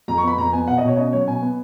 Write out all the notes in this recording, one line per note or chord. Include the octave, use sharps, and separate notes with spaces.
F2 A#5
C#6
B3 B5
F2 A#5
B3 G#5
B2 F#5
D#5
B2
C#5
C#4 D#5
F#3 C#5
B2 G#5
B3